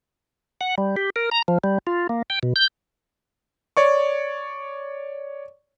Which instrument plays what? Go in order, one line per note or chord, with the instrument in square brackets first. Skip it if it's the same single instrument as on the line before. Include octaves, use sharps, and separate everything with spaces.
[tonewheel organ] F#5
G3
G4
A#4
A#5
F3
G3
F4
A#3
G5
B2
G6
[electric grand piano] C#5 D5 C#6